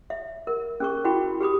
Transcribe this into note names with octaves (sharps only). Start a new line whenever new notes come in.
E5
A#4
C#4 G#4 C#6
E4 F#4 G#4 G5 B5
G4 G#4 B5 D#6